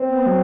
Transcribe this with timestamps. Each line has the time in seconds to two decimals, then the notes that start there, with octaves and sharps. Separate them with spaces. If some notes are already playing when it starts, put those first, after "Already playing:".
Already playing: C4
0.09 B3
0.26 F#3